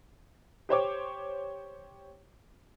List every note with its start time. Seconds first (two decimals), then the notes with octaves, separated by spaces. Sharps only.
0.69 G4 C5 C#5 D6